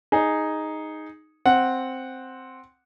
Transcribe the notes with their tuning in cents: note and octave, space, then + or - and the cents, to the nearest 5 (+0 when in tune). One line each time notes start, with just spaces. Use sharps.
D#4 +0 G#4 +0
C4 +0 F#5 -5